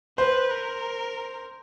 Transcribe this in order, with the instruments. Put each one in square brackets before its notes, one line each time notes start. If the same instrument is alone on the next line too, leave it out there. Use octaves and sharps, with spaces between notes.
[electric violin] B4 [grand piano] C5
[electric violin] A#4